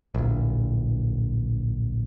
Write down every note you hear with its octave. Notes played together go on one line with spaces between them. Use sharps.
D1 A#1